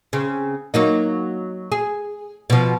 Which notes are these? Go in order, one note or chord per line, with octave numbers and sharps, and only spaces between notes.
C#3 C4
F#3 A#3 D#4
G#4
B2 F3